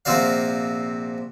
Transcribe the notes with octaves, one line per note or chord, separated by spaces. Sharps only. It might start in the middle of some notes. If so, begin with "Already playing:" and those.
A#1 C3 C4 F#4 D5 F5